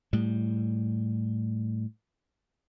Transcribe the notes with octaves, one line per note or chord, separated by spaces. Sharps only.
A2 G3